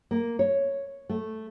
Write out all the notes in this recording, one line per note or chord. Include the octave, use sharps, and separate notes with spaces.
A#3
C#5
A3